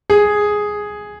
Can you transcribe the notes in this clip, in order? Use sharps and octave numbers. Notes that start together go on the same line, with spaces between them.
G#4